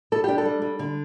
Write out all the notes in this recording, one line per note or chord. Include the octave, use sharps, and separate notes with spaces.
G3 A4
D4 G4
A4
G3
G3
D3